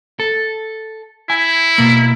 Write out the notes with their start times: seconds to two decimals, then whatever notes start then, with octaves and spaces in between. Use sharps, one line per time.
0.20 A4
1.30 E4 G#5
1.78 B2 A#3